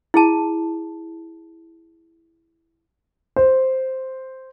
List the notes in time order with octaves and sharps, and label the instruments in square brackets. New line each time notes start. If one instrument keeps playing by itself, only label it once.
[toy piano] E4 G#4 A5
[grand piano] C5